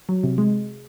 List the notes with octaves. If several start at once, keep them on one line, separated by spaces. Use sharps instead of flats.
F#3
C3
G#3